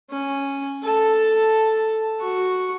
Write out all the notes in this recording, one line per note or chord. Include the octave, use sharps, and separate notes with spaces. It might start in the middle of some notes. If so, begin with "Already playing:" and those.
C#4
A4 A5
F#4 C#6